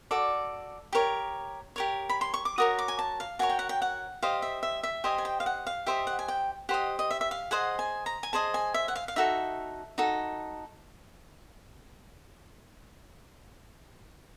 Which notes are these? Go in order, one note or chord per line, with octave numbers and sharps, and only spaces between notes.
F#4 A4 D5
G4 A#4 C#5
G4 A#4 C#5
B5
C6
C#6
D6
F#4 A#4 C#5 D#6
D6
G#5
A5
F5
F#4 A#4 C#5 G#5
G5
F#5
G5
F#5
G4 C5 D#5 F5
E5
E5
E5
G4 C5 D#5 G#5
G#5
G5
F5
F#5
F5
G4 C5 D#5 E5
F#5
G#5
G5
G4 C5 D#5 F#5
D#5
E5
E5
F5
G#4 C5 D#5 F#5
G#5
A#5
G#5
G#4 C5 D#5 A5
G#5
E5
F#5
F5
F5
D#4 F#4 A4 E5
D#4 F#4 A4